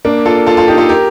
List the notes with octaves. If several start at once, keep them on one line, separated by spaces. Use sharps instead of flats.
A#3 D4
F4 A4
F4 A4
F4 A4
D#4 G4
F4 A4
G4 A#4